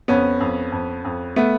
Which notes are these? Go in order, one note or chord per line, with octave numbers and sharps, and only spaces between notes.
F2 B3 C#4
F2
F2
F2
A3 B3